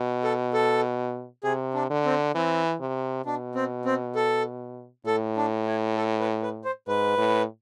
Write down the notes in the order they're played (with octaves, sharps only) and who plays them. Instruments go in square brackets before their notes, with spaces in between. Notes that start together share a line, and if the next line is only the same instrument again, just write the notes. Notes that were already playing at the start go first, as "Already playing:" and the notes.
Already playing: [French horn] B2
[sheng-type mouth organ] A4
A4
[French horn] C3 [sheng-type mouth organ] G#4
[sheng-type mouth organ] D4
[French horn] D3
[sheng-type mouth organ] C4
[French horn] E3 [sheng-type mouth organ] C4
[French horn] C3
[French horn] B2 [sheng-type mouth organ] D4
[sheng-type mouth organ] C4
C4
A4
[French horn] A2 [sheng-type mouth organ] A4
[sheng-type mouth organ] D4
E4
A4
B4
B4
C5
[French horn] G#2 [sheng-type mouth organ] B4
[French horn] A2